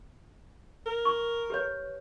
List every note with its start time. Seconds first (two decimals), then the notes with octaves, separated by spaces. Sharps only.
0.86 A#4
1.05 C#6
1.50 G4 B4 C#5